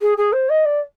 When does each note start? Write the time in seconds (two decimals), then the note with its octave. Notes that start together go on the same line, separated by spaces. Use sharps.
0.02 G#4
0.18 G#4
0.33 C5
0.50 D#5
0.65 D5